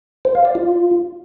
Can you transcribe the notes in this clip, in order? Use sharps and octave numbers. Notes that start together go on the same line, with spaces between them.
C5
F5
D5
F4